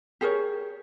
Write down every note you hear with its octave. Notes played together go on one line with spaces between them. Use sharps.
G4 G#4 A#4 C#5